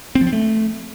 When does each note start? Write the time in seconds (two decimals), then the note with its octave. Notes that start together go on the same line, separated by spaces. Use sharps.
0.15 C4
0.21 F3
0.27 C4
0.33 A3